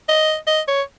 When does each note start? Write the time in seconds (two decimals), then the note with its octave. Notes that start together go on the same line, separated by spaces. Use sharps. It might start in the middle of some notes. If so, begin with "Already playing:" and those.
0.09 D#5
0.47 D#5
0.68 C#5